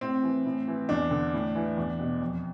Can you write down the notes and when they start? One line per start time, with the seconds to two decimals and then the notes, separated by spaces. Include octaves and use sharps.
0.01 A2 C4
0.23 E3
0.45 A2
0.68 E3
0.89 E2 D4
1.11 D3
1.34 A2
1.55 E3
1.77 E2
1.99 B2
2.22 F2